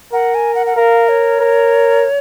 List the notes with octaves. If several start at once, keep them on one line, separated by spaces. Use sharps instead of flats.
A#4 F#5
G#5
F#5
F#5
A#4 F5
C#5
A#4